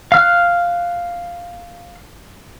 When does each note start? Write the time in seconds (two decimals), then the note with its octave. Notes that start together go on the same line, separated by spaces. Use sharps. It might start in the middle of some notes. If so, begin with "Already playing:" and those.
0.12 F5 F6 F#6